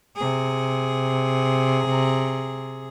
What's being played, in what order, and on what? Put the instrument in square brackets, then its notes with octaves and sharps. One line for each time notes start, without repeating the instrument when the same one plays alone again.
[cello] C3 G#4